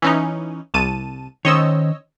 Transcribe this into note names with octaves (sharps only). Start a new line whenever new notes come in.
E3 C#4 D#4
C2 A5 D#7
D#3 C#4 C5 C#5 D#5 E6